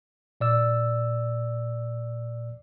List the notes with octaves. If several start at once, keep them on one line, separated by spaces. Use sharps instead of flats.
A#2 D5 E6